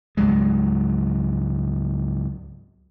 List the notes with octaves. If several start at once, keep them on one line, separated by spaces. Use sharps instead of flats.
C#2 G#2 F#3 G#3